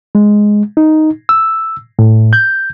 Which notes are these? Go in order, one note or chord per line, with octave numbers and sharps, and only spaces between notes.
G#3
D#4
E6
A2
G6